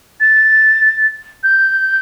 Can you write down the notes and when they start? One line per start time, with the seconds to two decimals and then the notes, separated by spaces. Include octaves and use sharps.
0.20 A6
1.43 G6